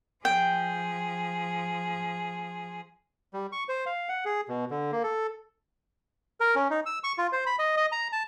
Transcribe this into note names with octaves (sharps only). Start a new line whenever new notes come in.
F3 G#4 G5
G3
C#6
C5
F5
F#5
G#4
B2
D3
A#3
A4
A#4
C#4
D#4
E6
C#6
F4
C5
B5
D#5
D#5
A#5
A5